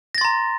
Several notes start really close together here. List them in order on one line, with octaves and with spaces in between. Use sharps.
A#6 A6 C6 A#5